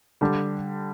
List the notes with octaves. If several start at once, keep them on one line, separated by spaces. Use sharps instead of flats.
D3 G3 D4 G4